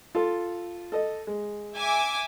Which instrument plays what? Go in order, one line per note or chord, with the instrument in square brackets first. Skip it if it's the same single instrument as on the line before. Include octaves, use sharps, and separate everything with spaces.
[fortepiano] F4 A4
A4 D#5
G#3
[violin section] E5 G#5 D6